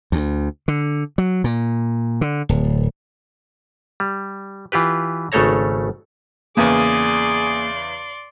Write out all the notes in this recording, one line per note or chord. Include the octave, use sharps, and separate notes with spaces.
D2
D3
F#3
A#2
D3
D1
G3
E3 F4 G4 B4
G#1 C#3 A3 A4 C#5 A#5
E2 C#3 A#3 B3 G#4 D5 G#5 C6